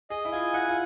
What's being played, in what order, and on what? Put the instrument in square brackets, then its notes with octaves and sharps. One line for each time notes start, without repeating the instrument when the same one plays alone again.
[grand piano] G#4 [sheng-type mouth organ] D#5
[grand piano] E4
[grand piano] F4 [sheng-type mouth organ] G#5
[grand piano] E4 [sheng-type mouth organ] F#5
[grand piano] F4